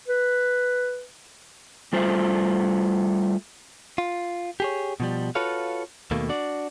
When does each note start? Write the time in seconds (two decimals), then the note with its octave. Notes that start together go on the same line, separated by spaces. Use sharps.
0.08 B4
1.93 G3 A3 F4 C5
3.98 F4
4.60 G4 G#4 C#5
5.00 B2 F3 G3
5.35 F4 F#4 A4 B4 C#5 F5
6.11 D#2 B2 A3 A#3
6.29 D4 F#4 D5